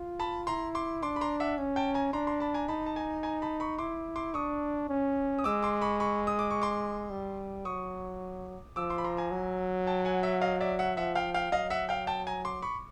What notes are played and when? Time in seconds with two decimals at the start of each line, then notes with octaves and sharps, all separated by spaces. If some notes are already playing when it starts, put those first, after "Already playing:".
Already playing: F4
0.20 A5 B5
0.47 E4 A#5 C6
0.75 C6 D6
1.02 D4 C6 D6
1.16 B5
1.21 A#5 C6
1.40 E5 F#5
1.58 C#4
1.76 G5 A5
1.94 G#5 A#5
2.13 D4 A#5 C6
2.27 A#5 C6
2.40 A5 B5
2.54 G#5 A#5
2.68 D#4 A5 B5
2.86 A5
2.96 G#5 A#5
3.23 G#5 A#5
3.42 A5 B5
3.60 B5 C#6
3.79 E4 C6 D6
4.16 C6 D6
4.34 D4 C#6 D#6
4.89 C#4
5.39 D#6
5.44 G#3 D6 E6
5.63 C6 D6
5.81 B5 C#6
6.00 B5 C#6
6.27 D#6
6.39 D6
6.51 C#6
6.62 C6 D6
7.10 G3
7.65 F#3 C#6 D#6
8.76 F3 D6 E6
8.90 C6 D6
8.98 B5
9.04 A#5 C6
9.17 G#5 A#5
9.31 F#3
9.87 G5 A5
10.05 F#5 G#5
10.23 E5 F#5
10.41 D#5 F5
10.60 D5 E5
10.79 E5 F#5
10.97 F3 E5 F#5
11.15 F5 G5
11.34 F5 G5
11.52 F#3 D#5 F5
11.70 E5 F#5
11.89 F5 G5
12.07 G5 A5
12.27 G#5 A#5
12.45 C6 D6
12.62 B5 C#6